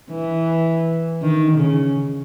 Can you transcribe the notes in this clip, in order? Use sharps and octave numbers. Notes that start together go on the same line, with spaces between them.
E3
D#3
C#3